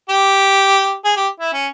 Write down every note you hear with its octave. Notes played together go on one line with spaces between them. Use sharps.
G4
G#4
G4
E4
C#4